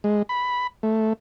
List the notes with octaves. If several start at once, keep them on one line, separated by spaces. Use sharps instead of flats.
G#3
B5
A3